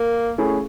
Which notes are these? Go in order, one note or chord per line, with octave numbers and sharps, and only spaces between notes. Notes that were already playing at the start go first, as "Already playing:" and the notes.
Already playing: A#3
A3 C#4 E4 G#4